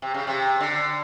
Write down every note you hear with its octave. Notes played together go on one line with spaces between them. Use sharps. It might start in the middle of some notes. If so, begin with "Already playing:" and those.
C3
C#3
C3
D3